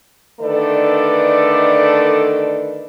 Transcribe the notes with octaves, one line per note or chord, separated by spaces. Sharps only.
D3 D#3 A3 A4 B4 D5